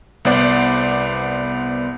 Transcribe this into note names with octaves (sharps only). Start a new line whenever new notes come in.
C2 B3 C5 D5 F#5 D6